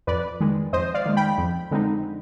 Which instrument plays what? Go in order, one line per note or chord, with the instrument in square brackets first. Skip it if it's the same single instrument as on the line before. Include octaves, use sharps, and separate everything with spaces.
[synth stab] F2 B4 D5
D#3 G#3
F2 C5 D#5
D5 F5
D#3 G#3
G5 B5
F2
D3 G#3 C4 D#4